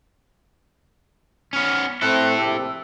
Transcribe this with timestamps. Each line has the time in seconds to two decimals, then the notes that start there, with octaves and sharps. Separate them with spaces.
1.53 B3 C#4 F6
2.02 A3 C4 E4 A4 F#6
2.38 A#1 C3 G4 E6